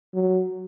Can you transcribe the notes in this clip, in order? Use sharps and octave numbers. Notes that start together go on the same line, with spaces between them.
F#3